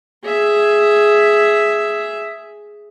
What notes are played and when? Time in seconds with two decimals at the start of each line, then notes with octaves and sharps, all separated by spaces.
0.24 G#4 E5